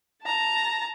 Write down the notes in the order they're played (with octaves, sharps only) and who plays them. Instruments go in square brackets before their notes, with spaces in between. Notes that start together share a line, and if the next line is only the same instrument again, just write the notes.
[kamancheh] A5 A#5